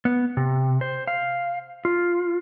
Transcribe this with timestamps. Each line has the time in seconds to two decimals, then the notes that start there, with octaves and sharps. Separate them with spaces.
0.05 B3
0.37 C3
0.81 C5
1.08 F5
1.85 F4